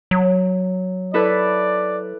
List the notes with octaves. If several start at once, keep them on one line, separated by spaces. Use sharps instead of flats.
F#3
E4 A4 B4 D5